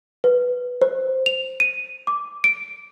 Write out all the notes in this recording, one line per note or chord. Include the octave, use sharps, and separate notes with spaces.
B4
C5
F7
D#7
D6
D7